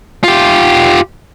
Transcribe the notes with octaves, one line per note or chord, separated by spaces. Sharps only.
F4 G4